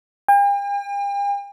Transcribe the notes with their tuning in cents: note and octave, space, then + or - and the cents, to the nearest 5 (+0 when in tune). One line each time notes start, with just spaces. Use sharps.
G5 +45